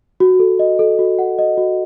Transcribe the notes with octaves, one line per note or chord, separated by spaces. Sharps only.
F#4
A4
D#5
A4
F#4
F#5
D#5
F#4